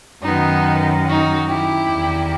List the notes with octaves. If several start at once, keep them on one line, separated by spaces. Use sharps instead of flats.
F#2 D#3 B3 D#4
D#4 F#4
E4 G4
E2 D#3